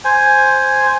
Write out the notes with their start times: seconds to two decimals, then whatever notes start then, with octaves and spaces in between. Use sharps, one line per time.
0.05 C5 G#5